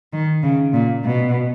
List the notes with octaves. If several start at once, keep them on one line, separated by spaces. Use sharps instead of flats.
D#3
C#3
A#2
B2